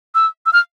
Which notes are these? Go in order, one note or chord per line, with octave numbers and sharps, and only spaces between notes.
E6
E6
F6